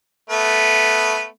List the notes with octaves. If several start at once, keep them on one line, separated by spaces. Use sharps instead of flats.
A3 B3